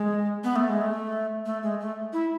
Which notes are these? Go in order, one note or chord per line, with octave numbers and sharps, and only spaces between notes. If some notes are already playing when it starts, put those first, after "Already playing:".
Already playing: G#3
B3
A3
G#3
A3
A3
G#3
A3
E4